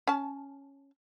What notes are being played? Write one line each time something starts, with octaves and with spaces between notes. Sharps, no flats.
C#4 A5